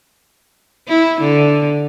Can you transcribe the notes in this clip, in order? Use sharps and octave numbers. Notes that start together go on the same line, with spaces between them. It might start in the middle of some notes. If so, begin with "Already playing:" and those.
E4
D3